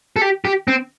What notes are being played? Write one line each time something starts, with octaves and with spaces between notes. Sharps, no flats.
A4
G4
G4
C4